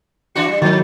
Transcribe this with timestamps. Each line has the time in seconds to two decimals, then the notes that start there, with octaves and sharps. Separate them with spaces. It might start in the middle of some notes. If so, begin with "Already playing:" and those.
0.35 E3 D4 F#4 C#7
0.48 G3
0.62 G#2 D#3 F#3 A6